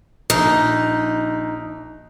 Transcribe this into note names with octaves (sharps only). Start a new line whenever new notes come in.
A#1 D#4